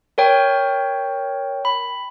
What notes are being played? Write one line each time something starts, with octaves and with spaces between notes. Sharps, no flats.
A#4 C#5 G5
B5